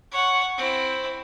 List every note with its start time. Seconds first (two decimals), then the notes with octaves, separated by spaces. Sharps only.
0.12 C#5 F#5
0.58 C4 E4